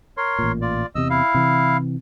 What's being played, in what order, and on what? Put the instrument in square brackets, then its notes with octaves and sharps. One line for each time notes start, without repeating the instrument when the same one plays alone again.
[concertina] A#4 C#5 C6
[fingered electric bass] A1 A#2
[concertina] F4 D5
[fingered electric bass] E2 C3 [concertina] D#5 E6
[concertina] E4 F5
[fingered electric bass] C3 E3